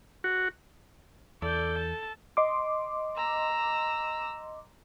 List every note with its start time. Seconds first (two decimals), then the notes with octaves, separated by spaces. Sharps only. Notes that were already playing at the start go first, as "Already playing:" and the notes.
0.24 F#4
1.42 E2 A4 D5 G6
1.78 A5
2.37 D#5 C6 D6
3.16 A#5 E6